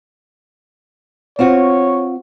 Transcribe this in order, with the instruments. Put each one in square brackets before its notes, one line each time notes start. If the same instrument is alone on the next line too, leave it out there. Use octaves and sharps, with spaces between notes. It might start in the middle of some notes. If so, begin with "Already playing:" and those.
[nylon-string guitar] C4 F4 F#4 [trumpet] C#5